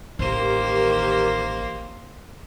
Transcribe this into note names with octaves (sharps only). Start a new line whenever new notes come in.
A1 D#3 A#3 G4 C5